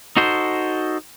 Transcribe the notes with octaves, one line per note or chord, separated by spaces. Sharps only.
D#4 F#4 A4 C5